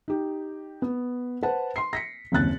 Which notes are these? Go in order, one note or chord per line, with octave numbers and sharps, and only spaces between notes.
D#4 G4
B3
B4 C5 F#5 A5
C6 C7
A#6 B6 C#7
F#1 D#2 C3 F#6 A6